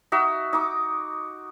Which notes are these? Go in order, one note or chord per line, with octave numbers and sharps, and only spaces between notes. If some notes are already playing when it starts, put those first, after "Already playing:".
D#4 F#4 E5
D#4 D6